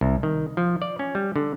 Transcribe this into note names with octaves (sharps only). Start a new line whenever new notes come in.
C2
D#3
F3
D5
C#4
G3
D3